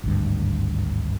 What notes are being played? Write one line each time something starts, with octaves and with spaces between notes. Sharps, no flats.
G#1 D2 G2